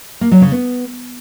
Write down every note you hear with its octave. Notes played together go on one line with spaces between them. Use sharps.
A#3
F#3
C#3
B3